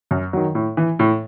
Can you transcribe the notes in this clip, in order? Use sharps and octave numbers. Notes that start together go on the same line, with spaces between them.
F#2
D#3 F#3
A2
E3
A2